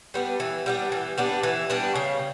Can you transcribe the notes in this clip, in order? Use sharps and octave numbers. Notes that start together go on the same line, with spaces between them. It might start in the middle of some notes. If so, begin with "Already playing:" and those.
G3 B3 D4
E3
G3 B3 D4
E3
G3 B3 D4
E3
G3 B3 D4
C#3